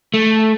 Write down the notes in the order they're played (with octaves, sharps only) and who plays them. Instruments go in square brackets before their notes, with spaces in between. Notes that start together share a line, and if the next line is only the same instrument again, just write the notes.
[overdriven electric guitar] A3